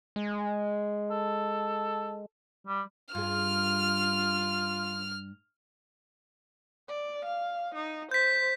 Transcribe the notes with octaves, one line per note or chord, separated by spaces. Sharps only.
G#3
A4
G3
G2 F4 G#4 F6
D5
F5
D#4
C5 G6 B6